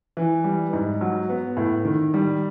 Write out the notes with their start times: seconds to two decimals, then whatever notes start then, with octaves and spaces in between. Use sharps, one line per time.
0.17 E3
0.44 G3
0.73 G#2
1.01 F#3
1.29 B3
1.57 A2
1.85 D#3
2.14 G3